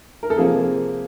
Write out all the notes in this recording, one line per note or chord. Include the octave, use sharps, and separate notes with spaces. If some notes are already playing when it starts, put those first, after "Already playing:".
A#4
A4
C3 F3 A#3 G#4